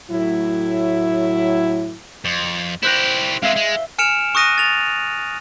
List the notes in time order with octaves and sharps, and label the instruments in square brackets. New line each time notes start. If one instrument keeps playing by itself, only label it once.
[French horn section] A2 F#3 E4
[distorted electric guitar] F2
[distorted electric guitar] E4 G4 [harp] C5 F#6 A#6
[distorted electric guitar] C3 G#3 [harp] E5 F5
[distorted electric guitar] G#3
[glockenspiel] G#5 F6 C#7 D7 E7 F7
C#6 D#6 F#6 A#6 D#7
A6 F7